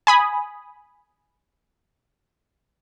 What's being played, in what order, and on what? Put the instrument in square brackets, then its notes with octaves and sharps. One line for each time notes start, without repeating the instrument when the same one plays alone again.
[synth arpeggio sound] G#5 B5 D#6